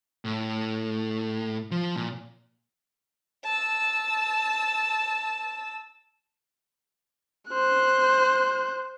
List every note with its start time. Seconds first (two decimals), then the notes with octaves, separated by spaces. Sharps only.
0.25 A2
1.71 F3
1.96 A#2
3.44 A5 E6
7.50 C5 F#6